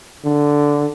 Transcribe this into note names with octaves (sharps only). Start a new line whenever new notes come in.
D3